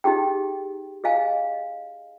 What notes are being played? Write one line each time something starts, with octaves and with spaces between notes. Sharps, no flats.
D#4 G4 G#4 G5
G#4 D#5 F5 G#5